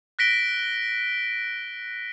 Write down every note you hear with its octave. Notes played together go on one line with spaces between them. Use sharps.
F#6 A#6 B6 D7 G7